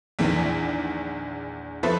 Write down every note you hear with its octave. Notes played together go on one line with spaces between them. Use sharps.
A#1 E2 D#3 E3
F3 B3 A4 B4 C5 E5